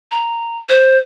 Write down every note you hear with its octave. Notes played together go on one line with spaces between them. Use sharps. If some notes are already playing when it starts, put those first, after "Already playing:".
A#5
C5